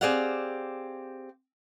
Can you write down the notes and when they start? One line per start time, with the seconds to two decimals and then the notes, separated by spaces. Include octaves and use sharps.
0.01 C4 G4 G#4 D5 F5 F#5